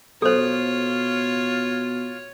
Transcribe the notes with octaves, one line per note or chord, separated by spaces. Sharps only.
B2 F4 A4 C5 C#5